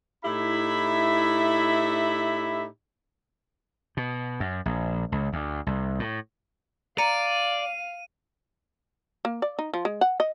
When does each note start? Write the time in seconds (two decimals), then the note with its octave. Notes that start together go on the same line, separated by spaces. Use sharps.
0.25 A2 D#4 E4 G4 E5 B5
3.97 B2
4.40 F#2
4.66 A#1
5.12 C#2
5.33 D2
5.66 C2
6.00 A2
6.98 D5 F5 A#5 C#7 D#7
9.25 A#3
9.42 D5
9.59 D#4
9.73 F3
9.85 G#3
10.01 F#5
10.20 D#5